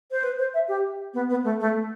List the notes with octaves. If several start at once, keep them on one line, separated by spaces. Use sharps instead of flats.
C5
B4
C5
E5
G4
B3
B3
A3
A3